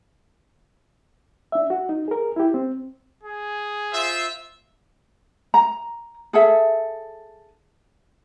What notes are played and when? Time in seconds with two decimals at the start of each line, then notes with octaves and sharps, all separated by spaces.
1.52 D4 E5
1.70 F#4
1.89 D#4
2.08 G#4 A#4
2.36 E4 G4
2.54 C4
3.23 G#4
3.93 F4 C5 E5
5.54 A#5
6.33 G#4 A4 E5